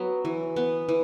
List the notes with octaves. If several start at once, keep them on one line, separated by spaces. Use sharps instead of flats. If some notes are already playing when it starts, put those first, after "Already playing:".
Already playing: F#3 B3 B4
E3
B3
E3